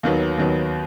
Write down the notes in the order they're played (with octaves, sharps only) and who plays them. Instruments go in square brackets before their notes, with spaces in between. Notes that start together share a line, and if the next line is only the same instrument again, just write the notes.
[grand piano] D#2 D#3 F#3 B3
D#2 D#3 F#3 B3